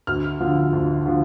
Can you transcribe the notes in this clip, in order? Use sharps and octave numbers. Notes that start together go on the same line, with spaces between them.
D2 F6
D3 F3
D2
D3 F3